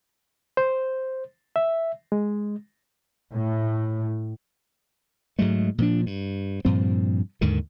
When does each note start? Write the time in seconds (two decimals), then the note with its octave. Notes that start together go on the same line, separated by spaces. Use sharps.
0.57 C5
1.56 E5
2.12 G#3
3.32 A2
5.39 G#2 F#3 G#3 A3
5.78 A#2 F3 D4
6.06 G2
6.65 G2 A#2 F3 C4
7.41 D#2 G#2 D3 D#3